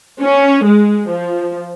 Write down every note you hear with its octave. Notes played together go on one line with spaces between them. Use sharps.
C#4
G#3
F3